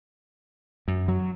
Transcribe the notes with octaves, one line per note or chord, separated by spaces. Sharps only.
F#2
F#3